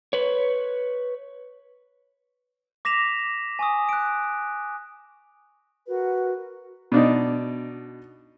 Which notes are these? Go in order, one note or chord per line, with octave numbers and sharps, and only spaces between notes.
B4 C#5
D6 A#6 B6 E7 F7
G#5 C#6 D#6
F#6 D7
F#4 A#4 B4
B2 D4 D#4